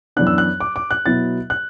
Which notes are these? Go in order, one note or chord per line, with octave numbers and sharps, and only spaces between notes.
F#2 E3 B3 D4 F#6
E6
F#6
D6
D6
F#6
B2 F#3 B3 E4 A6
F#6